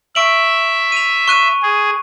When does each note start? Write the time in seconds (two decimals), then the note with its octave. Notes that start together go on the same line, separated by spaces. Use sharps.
0.15 E5 C#6 D7 F#7
0.92 D#7 F7
1.28 C#6 F#6 D#7
1.62 G#4